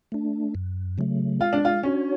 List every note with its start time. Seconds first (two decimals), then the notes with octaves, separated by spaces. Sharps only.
0.12 A3 D4
0.55 F#2
0.98 C#3 F#3 A3
1.40 G#3 F4
1.53 D4
1.65 F4
1.83 C#4 D4 F#4 C#5